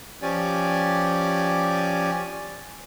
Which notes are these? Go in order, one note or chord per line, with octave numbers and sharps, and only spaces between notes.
F3 C#4 G4 D5 G#5